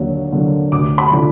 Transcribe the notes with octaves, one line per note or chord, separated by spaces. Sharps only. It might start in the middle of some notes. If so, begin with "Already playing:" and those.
Already playing: D#2 D3 F#3 A#3
D3 F#3 A#3
D2 D6
B5
D3 F3